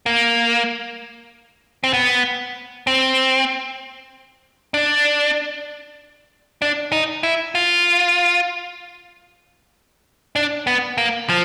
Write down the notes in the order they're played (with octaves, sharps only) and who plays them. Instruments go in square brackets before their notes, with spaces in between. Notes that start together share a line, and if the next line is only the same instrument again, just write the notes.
[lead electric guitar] A#3
C4
B3
C4
D4
D4
D#4
E4
F4
D4
B3
A#3
F3